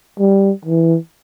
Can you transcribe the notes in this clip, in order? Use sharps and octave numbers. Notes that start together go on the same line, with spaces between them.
G3
E3